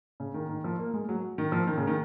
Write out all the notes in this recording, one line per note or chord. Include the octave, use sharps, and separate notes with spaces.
C#3
D#3
D#3
F3
A#3
G#3
F#3
D#3
F3
D#3
C#3
D#3